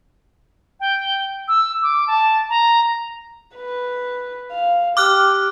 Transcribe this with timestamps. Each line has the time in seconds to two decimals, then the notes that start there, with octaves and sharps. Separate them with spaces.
0.80 G5
1.48 E6
1.83 D6
2.07 A5
2.50 A#5
3.55 B4
4.51 F5
4.97 G4 D6 F6 F#6